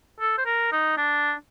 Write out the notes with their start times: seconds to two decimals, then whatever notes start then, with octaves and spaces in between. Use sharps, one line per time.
0.20 A4
0.38 C5
0.46 A#4
0.72 D#4
0.98 D4